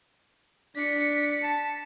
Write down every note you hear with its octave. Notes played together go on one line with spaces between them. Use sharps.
D4 B6 C#7
A5